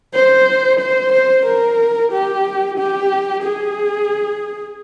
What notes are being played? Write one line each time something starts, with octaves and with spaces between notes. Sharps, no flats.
C5
C5
C5
A#4
G4
G4
G#4